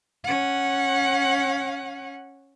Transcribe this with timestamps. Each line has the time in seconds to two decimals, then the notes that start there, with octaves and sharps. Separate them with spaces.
0.24 C#4 F#5